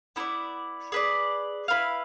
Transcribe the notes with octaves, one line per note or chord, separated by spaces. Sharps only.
B3 E4 A4 D5
G#4 B4 D5
E4 B4 F5